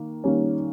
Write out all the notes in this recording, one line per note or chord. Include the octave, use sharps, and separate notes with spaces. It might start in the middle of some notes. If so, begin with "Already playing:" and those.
Already playing: D#3 A#3
D#3 G3 A#3 C#4